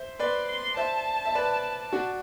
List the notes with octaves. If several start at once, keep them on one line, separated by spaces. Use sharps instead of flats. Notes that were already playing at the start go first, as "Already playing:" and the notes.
Already playing: C5 E5
B4 D5 C6
C6
C5 E5 A5
E5
B4 D5
D4 F#4